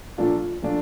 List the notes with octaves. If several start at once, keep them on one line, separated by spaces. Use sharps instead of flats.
A#2 F3 A3 D4 F4
A#2 F3 A3 D4 F4